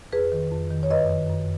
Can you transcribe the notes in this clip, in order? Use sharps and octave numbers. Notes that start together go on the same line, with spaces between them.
F2 G#4 B4
D#3
F2
D#3
C#5
F#2 B4 D#5
D#3
F#2